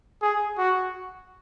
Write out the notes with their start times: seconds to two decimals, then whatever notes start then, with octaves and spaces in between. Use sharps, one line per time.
0.22 G#4
0.58 F#4